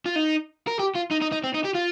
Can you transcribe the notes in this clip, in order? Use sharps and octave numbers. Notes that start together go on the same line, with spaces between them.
F4
D#4
A#4
G4
F4
D#4
D#4
D#4
C4
D#4
G4
F4